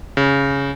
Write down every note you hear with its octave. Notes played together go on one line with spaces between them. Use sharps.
C#3